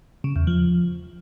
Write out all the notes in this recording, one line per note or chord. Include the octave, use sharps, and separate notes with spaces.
C#3
E2
F3